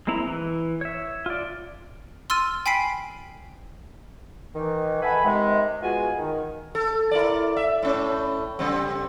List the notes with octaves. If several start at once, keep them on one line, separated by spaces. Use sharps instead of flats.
G#3 A#3 C4 E4 A#5
E3
C#5 E5
F4 D5
C6 E6 F6 A6 D#7
G5 G#5 B5 B6 C7 D7
D#3 E3
A4 B4 E5 F#5 G#5 B5
C3 D#3 G#3
G#3 B3 F4 F#4 G#5
D#3
A4
E4 A#4 D5
E5
A2 C#4
C#3 G3 C4